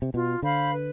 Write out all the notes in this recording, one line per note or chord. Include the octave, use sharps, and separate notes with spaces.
C3
B2 F4
D3 C5 F5 B5
B4